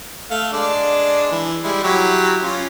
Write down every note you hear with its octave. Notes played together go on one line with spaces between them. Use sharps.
A3 F5
G#3 D4 D5
E3
G3 G#3 E4
F#3 E4 G4
C#4 F4